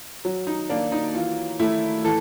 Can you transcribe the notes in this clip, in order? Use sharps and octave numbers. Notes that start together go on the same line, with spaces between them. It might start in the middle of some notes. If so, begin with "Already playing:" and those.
F#3
D#4
A#3 D4
D#4
E3 F4
A3 E4
E3 A4